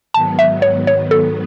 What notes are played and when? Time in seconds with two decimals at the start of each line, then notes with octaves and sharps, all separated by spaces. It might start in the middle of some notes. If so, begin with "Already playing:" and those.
0.14 G#2 D#3 F#3 B3 A5
0.39 E5
0.62 C#5
0.87 C#5
1.11 A4